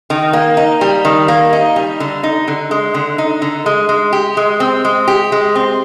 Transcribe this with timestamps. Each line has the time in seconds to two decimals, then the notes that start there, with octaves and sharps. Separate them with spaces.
0.10 D#3
0.33 A#3
0.57 D#4
0.81 G3
1.05 D#3
1.28 A#3
1.53 D#4
1.76 G3
2.00 D3
2.23 D#4
2.48 D3
2.71 G#3
2.94 D3
3.18 D#4
3.42 D3
3.66 G#3
3.89 G#3
4.13 G4
4.37 G#3
4.60 C4
4.85 G#3
5.08 G4
5.32 G#3
5.55 C4